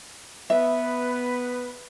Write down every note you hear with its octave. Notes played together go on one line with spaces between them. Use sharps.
B3 B4 E5